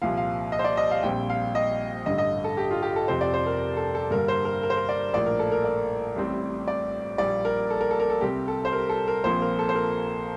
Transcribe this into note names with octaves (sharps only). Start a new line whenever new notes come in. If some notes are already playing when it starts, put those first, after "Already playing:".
C2 A#2 F3 F5
F5
D#5
C5
D5
D#5
F5
A#1 A#2 G3 C4 G5
F5
D#5
A1 G2 D3 D#5
D#5
A4
G4
F4
G4
A4
F1 F2 C3 F3 C4 C5
D5
C5
A#4
A4
A4
G2 D3 G3 A#3 A#4
C5
A#4
A#4
C5
A#4
D5
A#1 A2 F3 A#3 D5
A#4
A4
A#4
D5
A1 A2 G3 C4
D5
A#1 A#2 G3 D5
A#4
A4
A#4
A4
A#4
A4
C2 C3 G3 C4 G4
A4
C5
A#4
A4
A#4
A#1 A#2 F3 C4 C5
A#4
A4
C5
A#4